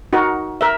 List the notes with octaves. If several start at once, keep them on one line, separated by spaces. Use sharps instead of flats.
D#4 F#4 A#4
A#4 E5